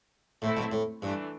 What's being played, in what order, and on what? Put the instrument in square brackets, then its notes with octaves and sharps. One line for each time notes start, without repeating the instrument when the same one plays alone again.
[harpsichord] A2 [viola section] A3 C4 E4 A4
[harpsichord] B1 B2
A2
[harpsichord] G2 [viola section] E3 A3 D4